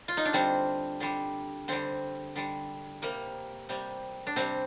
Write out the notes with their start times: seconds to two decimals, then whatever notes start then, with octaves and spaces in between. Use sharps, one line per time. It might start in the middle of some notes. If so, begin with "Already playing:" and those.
0.08 F4
0.17 D#4
0.25 D4
0.33 D3 G3 C4
1.00 D3 G3
1.68 D3 G3 C4
2.36 D3 G3
3.02 C3 G3 A#3
3.69 C3 G3
4.27 D4
4.36 C3 G3 C4